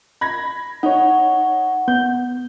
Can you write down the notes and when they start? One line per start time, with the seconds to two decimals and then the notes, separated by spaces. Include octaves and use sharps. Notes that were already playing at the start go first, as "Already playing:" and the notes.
0.21 B5 G#6 A#6
0.83 D#4 C#5 F#5
1.88 B3 G6